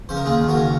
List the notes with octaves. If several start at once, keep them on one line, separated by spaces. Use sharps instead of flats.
C#3 C5
A#4
D#2 F4 G#4
D#2
F#4 A#4
C#3